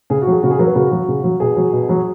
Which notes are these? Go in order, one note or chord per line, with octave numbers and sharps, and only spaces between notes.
C#3 G#4
F#4
F#3 G#4
C#3 F#4
G#4
F#3 A#4
B4
C#3 F#4
F#3
C#3
F#3
B2 G#4
F#3
B2
F#3